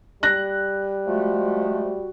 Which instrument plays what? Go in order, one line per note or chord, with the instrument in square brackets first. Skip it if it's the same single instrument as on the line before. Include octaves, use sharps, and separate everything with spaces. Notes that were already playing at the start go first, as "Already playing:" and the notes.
[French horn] G3 [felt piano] F#6 A#6
[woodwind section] F3 G#3 A3 [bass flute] F#4